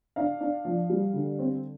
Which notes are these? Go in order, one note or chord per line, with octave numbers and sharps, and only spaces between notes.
D4 F5
D4
F3
G3
D3
C4